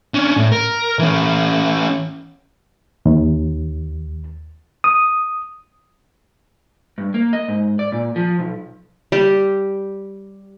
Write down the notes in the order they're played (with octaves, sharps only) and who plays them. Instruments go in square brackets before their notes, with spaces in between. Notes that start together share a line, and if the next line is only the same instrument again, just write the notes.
[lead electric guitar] C#4 D4
A2
A#4
E3 C#4
[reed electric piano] D#2
D#6
[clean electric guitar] G2
A#3
D#5
G#2
D5
A#2
F3
B1
[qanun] G3 G4